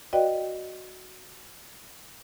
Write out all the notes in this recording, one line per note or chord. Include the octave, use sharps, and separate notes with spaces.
F#4 B4 D5 D#5 F5 G5